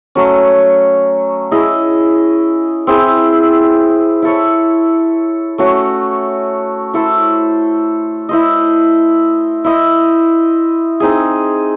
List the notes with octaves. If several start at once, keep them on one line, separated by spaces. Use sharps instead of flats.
F#3 A3 C#4
E4 G#4 D#5
C4 E4 G#4 C5
E4 A4 C#5
A3 C#4 F#4
E4 A4 C5
E4 C5 D#5
E4 C5 D#5
C4 D#4 G#4